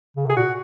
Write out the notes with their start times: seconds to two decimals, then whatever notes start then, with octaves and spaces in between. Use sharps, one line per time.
0.16 C#3
0.26 C3 G#4
0.37 A#2 F#4